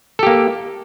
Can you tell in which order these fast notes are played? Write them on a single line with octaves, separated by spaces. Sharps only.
A4 G4 A#3